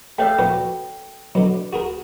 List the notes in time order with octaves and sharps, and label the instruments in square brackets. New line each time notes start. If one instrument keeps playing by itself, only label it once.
[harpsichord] A3 D5 A5 [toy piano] A4 C#5 G5 [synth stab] E5 F5
[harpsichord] A#2 F3 B3 [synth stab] F#4
[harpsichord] B2 D3 [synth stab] F#3
[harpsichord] F#4 G#4 A#4